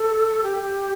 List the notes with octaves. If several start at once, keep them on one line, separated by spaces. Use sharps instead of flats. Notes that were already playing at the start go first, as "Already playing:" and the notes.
Already playing: A4
G4